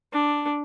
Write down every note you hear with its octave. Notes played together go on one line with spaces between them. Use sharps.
D4